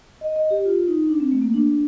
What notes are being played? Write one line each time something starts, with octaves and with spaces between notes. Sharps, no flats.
D#5
D#5
G4
F4
D#4
D4
C4
A3
A#3
D4